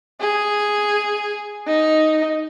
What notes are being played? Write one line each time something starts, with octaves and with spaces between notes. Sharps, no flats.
G#4
D#4